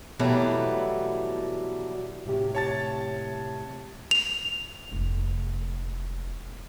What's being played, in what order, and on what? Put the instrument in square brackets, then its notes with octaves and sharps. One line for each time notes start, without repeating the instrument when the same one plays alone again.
[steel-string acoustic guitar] B2 E3 F#3 G3 A3
[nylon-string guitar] A2 C3 G4
[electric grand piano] C#5 A5 A6
[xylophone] F7
[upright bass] F1 A3